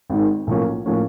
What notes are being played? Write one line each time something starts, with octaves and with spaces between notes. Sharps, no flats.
G#1 G#2 D#3
B1 A2 F3 A#3 C#4
A2 F3 A#3 C#4